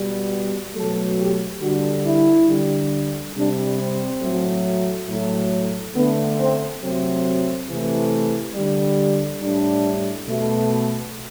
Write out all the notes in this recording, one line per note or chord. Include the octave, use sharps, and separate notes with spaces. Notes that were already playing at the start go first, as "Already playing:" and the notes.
Already playing: B2 G3
B2 F#3 A3 A4
G4
D3 G3 F#4
E4
D3 G3
C3 G3 D4
C4
A2 F#3 A3
A2 F#3 A3
D3 A3 B3
C4
C3 F#3 A3 C4
C3 E3 A3
D3 G3
A2 G3 D4
B2 A3